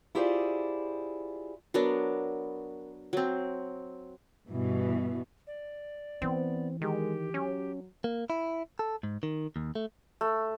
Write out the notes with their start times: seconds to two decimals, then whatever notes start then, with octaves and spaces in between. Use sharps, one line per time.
0.15 E4 F4 G4 G#4 C5 D5
1.74 F#3 B3 D4 A#4
3.13 F#3 C4
4.48 G2 B2 E3
5.47 D5
6.22 E3 B3 C4
6.81 D#3 G#3 G4
7.34 F#3 C#4
8.04 A#3
8.30 E4
8.79 A4
9.03 G#2
9.23 D#3
9.56 D#2
9.75 A3
10.21 A3